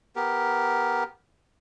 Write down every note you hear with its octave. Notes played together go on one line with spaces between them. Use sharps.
B3 G4 A#4